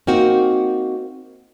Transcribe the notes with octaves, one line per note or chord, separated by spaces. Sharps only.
A#3 C4 D#4 F#4